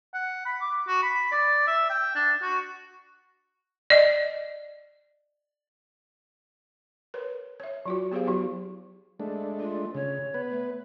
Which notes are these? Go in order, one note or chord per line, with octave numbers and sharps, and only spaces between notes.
F#5
B5
D6
F#4
B5
D5
E5
G5
D4
F#4
D5 D#5
A#4 B4 C#5
C#5 E5
F#3 F4 F#4
B3 G4 G#4 C5 F5
F#3 E4 F#4 G4
G#3 A3 D4
F4
C#3 C#5
B3 B4
A3